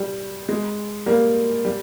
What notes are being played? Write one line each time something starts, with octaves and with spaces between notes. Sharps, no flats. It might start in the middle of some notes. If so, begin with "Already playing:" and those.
Already playing: G3
G#3
G3 A#3
G3